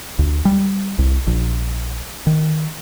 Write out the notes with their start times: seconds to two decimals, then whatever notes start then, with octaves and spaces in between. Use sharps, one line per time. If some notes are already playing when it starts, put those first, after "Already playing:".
0.19 D2
0.45 G3
0.99 C2
1.27 A#1
2.27 D#3